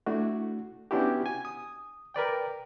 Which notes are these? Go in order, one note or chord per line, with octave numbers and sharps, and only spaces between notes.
A3 D4 E4 F#4
B3 C#4 D4 E4 F#4 G4
G#5
D#6
A#4 B4 D5 G5